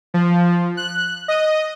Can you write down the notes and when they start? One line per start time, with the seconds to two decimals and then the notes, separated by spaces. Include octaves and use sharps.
0.14 F3
0.77 F#6
1.28 D#5